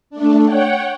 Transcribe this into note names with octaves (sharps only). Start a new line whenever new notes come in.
A3 D4
C#5 F#5 G5